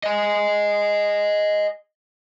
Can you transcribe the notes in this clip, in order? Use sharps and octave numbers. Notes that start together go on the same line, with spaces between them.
D#5 G#5